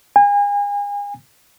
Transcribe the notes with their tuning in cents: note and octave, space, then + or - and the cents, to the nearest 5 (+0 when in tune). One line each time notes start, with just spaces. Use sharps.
G#5 -35